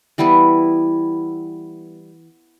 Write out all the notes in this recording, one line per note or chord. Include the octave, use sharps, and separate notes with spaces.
E3 G3 B3 E4